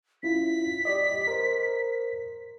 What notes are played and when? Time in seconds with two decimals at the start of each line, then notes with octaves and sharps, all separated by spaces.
0.23 C#4 E4 F4 B6
0.85 G4 D5 D#5
1.27 A#4 C5